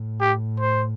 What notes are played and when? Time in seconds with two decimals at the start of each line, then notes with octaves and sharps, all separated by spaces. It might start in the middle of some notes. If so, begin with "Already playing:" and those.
Already playing: A2
0.21 G4
0.60 C5